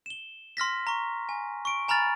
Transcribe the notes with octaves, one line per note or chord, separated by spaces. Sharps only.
E7 G7
C6 F6 A#6 B6
A#5 C#6
G#5
C#6 D7
G#5 A#5 B5 F6 A6